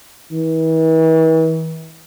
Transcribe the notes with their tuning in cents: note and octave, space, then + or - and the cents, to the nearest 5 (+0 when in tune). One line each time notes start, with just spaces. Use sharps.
E3 -40